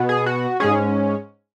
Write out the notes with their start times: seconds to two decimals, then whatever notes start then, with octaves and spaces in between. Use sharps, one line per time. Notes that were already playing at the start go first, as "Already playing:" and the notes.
Already playing: B2 B3
0.09 G#4
0.26 F#4
0.60 G#2 G#3 C#4 G#4